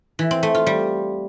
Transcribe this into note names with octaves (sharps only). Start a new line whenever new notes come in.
E3
C4
A3
F4
G3